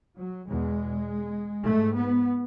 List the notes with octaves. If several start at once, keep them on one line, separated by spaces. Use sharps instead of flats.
F#3
E2 B2 G#3
G#2 A3
B3